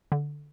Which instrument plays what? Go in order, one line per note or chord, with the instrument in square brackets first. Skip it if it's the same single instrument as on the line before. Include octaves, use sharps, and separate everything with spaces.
[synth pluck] D3